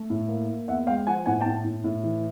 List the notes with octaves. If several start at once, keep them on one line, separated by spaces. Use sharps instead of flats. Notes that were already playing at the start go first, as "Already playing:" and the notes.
Already playing: A3
A2
A#3
A#3
E2 E5 F#5
G#3 F5 G5
F3 F#5 G#5
A2 F#5 G#5
G5 A5
A2
A2
A2
E3